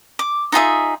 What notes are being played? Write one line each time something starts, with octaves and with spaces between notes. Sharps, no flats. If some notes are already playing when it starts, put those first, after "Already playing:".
D6
D#4 F4 G#4 E5